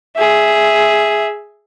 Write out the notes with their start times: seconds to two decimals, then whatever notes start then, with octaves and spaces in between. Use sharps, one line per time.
0.16 G#4 E5